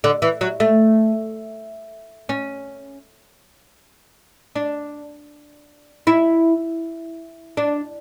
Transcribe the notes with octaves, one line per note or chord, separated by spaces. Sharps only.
D3
E3
F#3
A3
C#4
D4
E4
D4